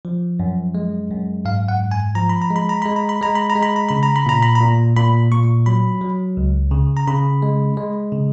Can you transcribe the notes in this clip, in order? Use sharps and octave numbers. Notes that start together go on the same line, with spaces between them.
F3
F#2
G#3
F#2
G#2 F5
F#5
G#2
G#5
F3 A#5
B5
A#5
G#3
B5
A#5
G#3 B5
A#5
B5
G#3 A#5
B5
A#5
G#3
B5
A#5
C#3 B5
A#5
B5
A#2 A#5
B5
A#5
A#2
A#2 B5
A#2 C#6
F#3 B5
F#3
C#2
C#3
A#5
C#3 B5
G#3
G#3
C#3